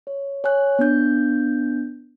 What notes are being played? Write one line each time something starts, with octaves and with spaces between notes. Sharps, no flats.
C#5
C#5 G#5 F#6
B3 D4 G6